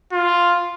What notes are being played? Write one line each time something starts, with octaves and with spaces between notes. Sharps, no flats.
F4